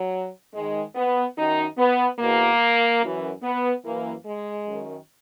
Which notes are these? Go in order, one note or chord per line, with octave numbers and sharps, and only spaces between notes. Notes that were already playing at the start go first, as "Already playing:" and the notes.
Already playing: F#3
G#2 D#3 G#3
B3
F#2 D#3 D#4
B3
E2 B2 A#3
F#2 E3
B3
F#2 E3 A#3
G#3
F#2 D#3